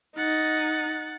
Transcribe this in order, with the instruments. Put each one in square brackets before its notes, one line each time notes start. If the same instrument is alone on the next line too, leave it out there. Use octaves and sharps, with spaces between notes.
[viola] D#4 [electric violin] F#5 A6